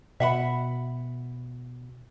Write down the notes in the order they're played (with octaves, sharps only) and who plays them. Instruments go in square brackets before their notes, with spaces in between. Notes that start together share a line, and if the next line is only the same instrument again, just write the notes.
[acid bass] B2 [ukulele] E5 F#5 B5